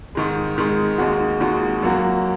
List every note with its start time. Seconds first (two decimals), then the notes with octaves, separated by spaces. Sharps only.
0.15 G#2 D#3 G#3
0.57 G#2 D#3 G#3
0.98 D#2 D#3 G#3 F#4
1.41 D#2 D#3 G#3 F#4
1.82 F#2 F#3 A#3 F#4